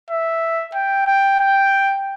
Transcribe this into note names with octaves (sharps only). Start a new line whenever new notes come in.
E5
G5
G5
G5